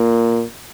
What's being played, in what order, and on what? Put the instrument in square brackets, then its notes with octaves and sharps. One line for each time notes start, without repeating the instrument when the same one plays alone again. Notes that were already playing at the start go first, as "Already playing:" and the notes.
Already playing: [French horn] A#2